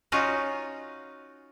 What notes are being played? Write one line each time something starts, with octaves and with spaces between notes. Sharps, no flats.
C#4 D#4 F4 F#4